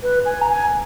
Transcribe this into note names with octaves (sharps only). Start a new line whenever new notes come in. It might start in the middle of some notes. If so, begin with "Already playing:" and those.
B4
G#5
A#5
G#5